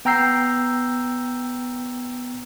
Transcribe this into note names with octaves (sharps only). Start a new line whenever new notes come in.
B3 G5 A#5 E6 G6 C7